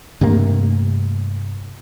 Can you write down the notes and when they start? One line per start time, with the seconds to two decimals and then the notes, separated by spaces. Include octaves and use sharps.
0.21 G2 C3 A3 A#3